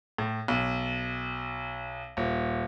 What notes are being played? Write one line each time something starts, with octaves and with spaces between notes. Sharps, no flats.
A2
B1
D#1